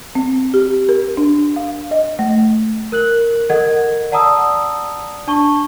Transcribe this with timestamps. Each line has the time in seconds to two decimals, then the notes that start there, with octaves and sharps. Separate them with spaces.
0.15 C4
0.54 G4
0.89 A#4
1.17 D4
1.56 F5
1.91 D#5
2.19 A3
2.92 A#4 F#6 F#7
3.50 A4 A#4 D#5 F#5 G#6
4.12 D5 F#5 A5 A#5 D#6 E6
5.27 D4 A5 C#6 G7